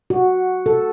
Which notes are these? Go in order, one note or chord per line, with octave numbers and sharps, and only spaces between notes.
F#4
A4